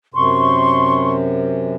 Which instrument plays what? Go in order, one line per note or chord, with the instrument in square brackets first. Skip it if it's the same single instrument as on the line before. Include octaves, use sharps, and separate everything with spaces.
[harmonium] F#2 C3 [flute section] C6 C#6